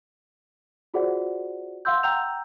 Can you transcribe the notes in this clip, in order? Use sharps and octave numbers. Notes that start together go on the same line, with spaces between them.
F4 F#4 G#4 C5 D5 F#5
F5 F#5 C6 E6 G6
F#5 G5 A#5 E6 G6 F7